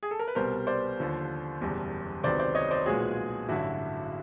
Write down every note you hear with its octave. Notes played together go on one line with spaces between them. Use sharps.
G#4
A4
A#4
B4
C2 B2 G3 B3 A#4 C5
C5 D5
D#2 D3 F3
F#1 E2 B2 G3
C#2 C3 D#3 F#3 B3 C5 D5
C5 D5
C#5 D#5
C5 D5
B1 A#2 F3 G#3 B3 F#4 G#4
A1 G2 D3 F#3 E4 F#4